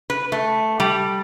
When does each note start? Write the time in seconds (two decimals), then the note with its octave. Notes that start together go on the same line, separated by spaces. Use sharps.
0.10 B4
0.32 A3
0.80 G3